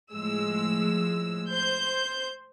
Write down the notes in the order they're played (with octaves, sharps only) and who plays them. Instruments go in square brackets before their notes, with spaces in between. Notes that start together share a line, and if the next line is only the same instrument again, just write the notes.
[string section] A2 F3 G#3 E6
C5 G6